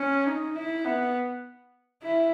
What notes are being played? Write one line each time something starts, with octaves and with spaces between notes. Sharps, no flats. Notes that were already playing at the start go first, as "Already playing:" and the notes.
Already playing: C#4
D#4
E4
B3
E4